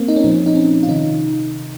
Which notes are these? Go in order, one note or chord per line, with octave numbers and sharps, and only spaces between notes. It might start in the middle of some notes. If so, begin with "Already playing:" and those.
Already playing: A#3 C4
D#4
C#4
A#2 F3 C4
D#4
C#4
F4
C3 D#3 D#4